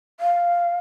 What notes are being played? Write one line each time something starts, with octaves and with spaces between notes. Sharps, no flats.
F5